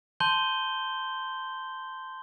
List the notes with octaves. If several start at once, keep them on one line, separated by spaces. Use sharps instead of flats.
A5 C6 G6 G7